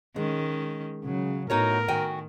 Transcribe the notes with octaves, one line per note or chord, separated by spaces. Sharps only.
D#3 G#3 C#4
C#3 F#3
A2 B3 D#4 F#4 A#4 C#5
D#3 F#4 G5 G#5